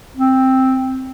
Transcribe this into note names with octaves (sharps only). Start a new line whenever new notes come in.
C4